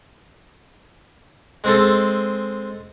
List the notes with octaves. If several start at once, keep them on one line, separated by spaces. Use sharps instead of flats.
G#3 C4 G#4 A4